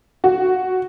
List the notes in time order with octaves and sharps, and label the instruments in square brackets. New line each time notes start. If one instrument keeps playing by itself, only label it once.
[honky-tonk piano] F#4